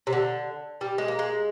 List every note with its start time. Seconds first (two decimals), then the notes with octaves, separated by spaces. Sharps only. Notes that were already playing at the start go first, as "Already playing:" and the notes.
0.07 C3
0.12 D3
0.81 G3
0.98 G#3
1.08 A#3
1.19 G#3